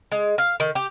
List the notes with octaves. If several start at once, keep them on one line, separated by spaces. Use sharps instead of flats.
G#3
F5
D#3
G4